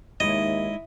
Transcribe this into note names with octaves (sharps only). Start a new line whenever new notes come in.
D#2 G#3 D#4 E4 C#5 D#5